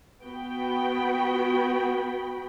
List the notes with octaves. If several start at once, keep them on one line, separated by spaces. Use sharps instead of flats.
B3 F#4 G5 B5